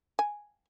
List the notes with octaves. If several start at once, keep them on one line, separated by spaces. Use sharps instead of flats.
G#5